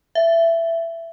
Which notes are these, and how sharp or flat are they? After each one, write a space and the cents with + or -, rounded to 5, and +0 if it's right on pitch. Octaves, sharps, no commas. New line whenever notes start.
E5 +15